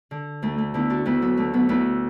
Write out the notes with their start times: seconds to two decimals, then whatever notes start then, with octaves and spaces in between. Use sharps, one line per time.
0.11 D3
0.42 D2 A3
0.58 A3
0.74 D3 B3 E4
0.90 D4 F#4
1.05 D2 B3 E4
1.22 F#3 B3
1.37 D3 A3
1.53 F#3 B3
1.69 D2 B3 E4